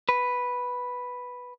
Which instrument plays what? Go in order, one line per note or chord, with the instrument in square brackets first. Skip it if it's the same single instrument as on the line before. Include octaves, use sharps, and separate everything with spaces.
[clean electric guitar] B4